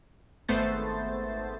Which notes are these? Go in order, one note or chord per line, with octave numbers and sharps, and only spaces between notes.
G#1 A3 B3 C5 A6